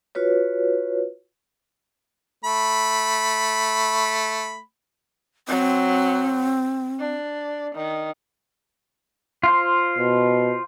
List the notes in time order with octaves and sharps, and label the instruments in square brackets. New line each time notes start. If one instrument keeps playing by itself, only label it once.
[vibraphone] F4 F#4 B4 C#5
[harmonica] A3 B5
[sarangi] F#3 [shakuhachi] C4
[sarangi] D4
D#3
[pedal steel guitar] F4 C5
[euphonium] B2